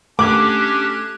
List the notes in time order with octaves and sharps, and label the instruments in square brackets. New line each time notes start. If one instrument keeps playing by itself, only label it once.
[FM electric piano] A3 F#6 G#6 [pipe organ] C#4 D4 G4 [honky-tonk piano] D6